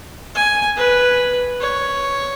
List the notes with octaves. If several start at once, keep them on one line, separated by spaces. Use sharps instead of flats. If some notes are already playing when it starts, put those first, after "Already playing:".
G#5
B4
C#5